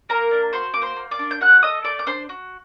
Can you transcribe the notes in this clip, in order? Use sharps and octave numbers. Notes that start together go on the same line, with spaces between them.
A#3 A#4 A#5
D4
F#4 C5 C6
A#3 D6
C5 C6
A#3
D5 D6
D4
G6
F#4 F#5 F#6
A4 D#5 D#6
A3 D5 D6
D6
D4 C5 C6
F#4